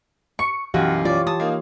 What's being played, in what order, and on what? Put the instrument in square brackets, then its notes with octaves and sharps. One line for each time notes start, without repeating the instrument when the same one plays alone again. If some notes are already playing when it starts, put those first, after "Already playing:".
[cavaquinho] C#6 [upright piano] C#7
[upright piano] B1 F#2 [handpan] E3 G4 F5 [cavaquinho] F#4
[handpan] F4 C#5 [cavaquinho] D5
[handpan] G4 [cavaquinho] A5 D#6
[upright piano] A#3 D#4